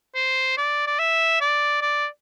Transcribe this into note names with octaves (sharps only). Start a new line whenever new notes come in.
C5
D5
D5
E5
D5
D5